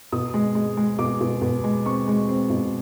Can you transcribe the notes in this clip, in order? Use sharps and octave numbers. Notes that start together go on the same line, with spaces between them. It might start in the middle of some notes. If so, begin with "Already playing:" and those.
B2 D#6
G#3
G#3
G#3
B2 D6
B2
B2
G#3
C4 C#6
G#3
C4
B2